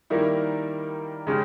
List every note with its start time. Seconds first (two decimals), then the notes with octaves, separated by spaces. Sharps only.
0.10 D#3 G3 A#3 E4 A#4
1.27 C#3 G#3 C#4 G4